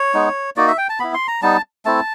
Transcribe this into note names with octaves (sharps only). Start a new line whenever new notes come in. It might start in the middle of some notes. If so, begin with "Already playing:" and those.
Already playing: C#5
G#3 B3 D#4
A#3 D#4 F#4 D5
E5
G5
A5
B3 E4 B5
C6
A#5
G3 B3 D#4 A5
A3 C4 E4 A5